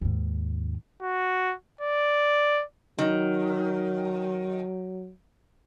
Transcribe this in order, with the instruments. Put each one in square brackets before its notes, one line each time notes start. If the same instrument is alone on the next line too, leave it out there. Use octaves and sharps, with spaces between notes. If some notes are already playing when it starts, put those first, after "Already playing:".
[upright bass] D#2 G#2
[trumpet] F#4
D5
[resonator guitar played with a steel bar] D#3 [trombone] F#3